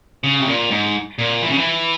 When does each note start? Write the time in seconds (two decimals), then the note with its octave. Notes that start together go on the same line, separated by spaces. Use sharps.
0.24 C#3
0.40 C3
0.47 A#2
0.71 G#2
1.19 A#2
1.42 E3
1.50 C#3
1.58 E3